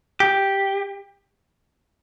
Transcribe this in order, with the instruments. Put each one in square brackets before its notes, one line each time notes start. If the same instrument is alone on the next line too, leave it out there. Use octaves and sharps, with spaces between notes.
[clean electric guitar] G4